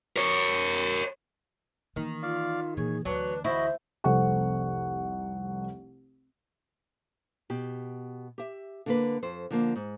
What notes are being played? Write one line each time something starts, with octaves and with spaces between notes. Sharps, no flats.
A#4 C#5
D#3 E3 A#3
F4 D5 F5
A#2 E3 G#4 C#5
D2 E3 F#3 D4 B4
E4 F#4 C5 D#5 B5
F1 C2 A4 C5 F#5 C#6
B2 G4
G4 E5
D3 A#3 B4
F2 C5
D3 F3 A#3
G#2